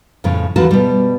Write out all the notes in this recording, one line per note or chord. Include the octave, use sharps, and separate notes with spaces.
F2 A2 C#3
D#2 E3 A3 F4 F#4 A5
B2 G3